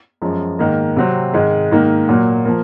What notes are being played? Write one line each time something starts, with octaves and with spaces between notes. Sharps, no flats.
F#2 F3 G#3
G#2 D#3 A#3
C3 F#3 C4
G#2 D#3 G#3
G#2 D#3 A#3
A#2 F#3 A#3
F3 A#3